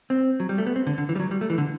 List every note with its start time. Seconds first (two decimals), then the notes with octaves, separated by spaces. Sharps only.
0.10 C4
0.40 F#3
0.49 G3
0.58 A3
0.67 B3
0.76 C4
0.87 D3
0.98 D3
1.09 E3
1.15 G3
1.20 F#3
1.31 G3
1.41 A3
1.50 E3
1.58 D3